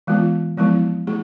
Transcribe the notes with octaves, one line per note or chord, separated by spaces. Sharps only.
E3 G#3 B3 F4
F3 G#3 B3 E4
A3 E4 G#4